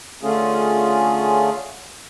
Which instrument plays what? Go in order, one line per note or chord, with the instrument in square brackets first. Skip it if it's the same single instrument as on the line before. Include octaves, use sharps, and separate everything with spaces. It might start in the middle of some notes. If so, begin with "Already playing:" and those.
[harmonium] D3 A3 C#4 F4 G#4